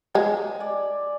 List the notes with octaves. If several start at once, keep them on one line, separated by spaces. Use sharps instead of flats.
G#3 G#5
D5